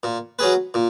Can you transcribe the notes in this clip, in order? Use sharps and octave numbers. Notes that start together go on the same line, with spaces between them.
A#2
F#3 C#4 G#4 B4
A#2